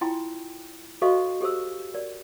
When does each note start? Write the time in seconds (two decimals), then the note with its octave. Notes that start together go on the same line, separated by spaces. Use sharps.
0.01 E4 F4 G5 G#5 C6
1.02 F#4 A4 C5 D#5 F5 C#6
1.41 G4 A4 C5 E6
1.94 A#4 D5